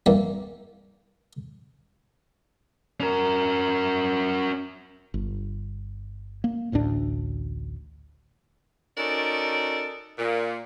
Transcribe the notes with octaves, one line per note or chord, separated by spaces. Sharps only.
E3 G3 A#3
C#4 A#4
G1
A#3
A1 D2 A2 D4
C#4 D#4 F#4 A4 A#4 D5
A#2